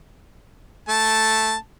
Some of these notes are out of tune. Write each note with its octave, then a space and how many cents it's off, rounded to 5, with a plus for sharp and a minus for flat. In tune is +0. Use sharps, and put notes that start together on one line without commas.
A3 +0 A5 +0